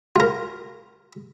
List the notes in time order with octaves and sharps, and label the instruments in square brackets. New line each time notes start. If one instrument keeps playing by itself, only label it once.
[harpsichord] F4 A#4